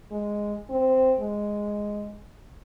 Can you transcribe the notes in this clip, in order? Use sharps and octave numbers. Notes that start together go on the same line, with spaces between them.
G#3
C4
G#3